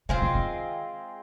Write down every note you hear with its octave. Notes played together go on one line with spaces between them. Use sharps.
D3 G#3 C4 F4
D3
D#3